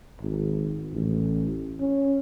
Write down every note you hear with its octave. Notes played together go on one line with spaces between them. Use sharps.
G#1
A1
C#4